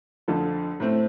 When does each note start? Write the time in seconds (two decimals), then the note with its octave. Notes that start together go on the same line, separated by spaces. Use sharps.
0.28 F2 D3 F3 A4
0.80 A2 A3 C4